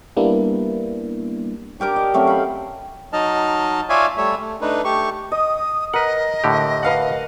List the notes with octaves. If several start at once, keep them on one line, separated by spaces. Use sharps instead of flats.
G3 A#3 B3 D4 E4
D4 G4 A#4 D6
D#5
F#3 A3 C4 C#4
F5 B5
F#3 D#4 D#5 A5 F6
F4 C#5 D5 E5 F5 G#5
G3 A3 C#5 E5
A3
A3 D4 D#4 B4
A3 G4 C#6
D#5 D#6
A#4 B4 D#5 F#5
A2 D3 G4
B4 F5 F#5